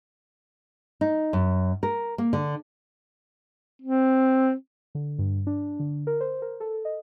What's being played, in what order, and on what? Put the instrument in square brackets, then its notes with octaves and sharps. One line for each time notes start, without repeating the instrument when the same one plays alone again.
[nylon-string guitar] D#4
F#2
A#4
A#3
D3
[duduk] C4
[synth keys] D3
G2
D4
D3
A#4
C5
A#4
A4
D#5